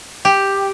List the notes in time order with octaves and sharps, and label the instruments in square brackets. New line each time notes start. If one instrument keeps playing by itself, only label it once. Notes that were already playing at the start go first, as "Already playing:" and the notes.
[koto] G4